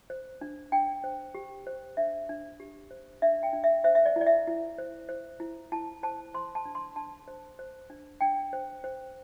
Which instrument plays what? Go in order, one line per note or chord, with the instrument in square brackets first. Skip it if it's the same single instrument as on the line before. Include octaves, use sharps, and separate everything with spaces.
[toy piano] C5
D4
D4 G5
C5
G4
C5
D4 E5
D4
G4
C5
D4 E5
G5
D4
E5
C5 E5
E5
D5
E4
D5
E5
E4
C5
C5
E4
E4 A5
C5 A5
C5 C6
A5
D4
C6
D4 A5
C5
C5
D4
D4 G5
C5
C5